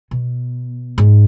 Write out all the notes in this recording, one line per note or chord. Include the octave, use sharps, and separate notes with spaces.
B2
G#2